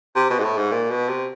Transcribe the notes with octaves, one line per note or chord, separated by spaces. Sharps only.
C3
B2
G#2
A2
G#2
A#2
B2
C3